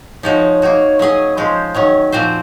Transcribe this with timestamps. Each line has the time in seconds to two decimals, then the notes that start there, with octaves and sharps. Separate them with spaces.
0.23 F3 G#3 D#4 F#4 C#5
0.62 A#3 D#4 F#4
0.99 F#3 C#4 G#4 C#5 D#5
1.37 F3 G#3 C#4 C5
1.75 D#3 F#3 C#4 C#5
2.12 A#2 F3 C4 F#4 C5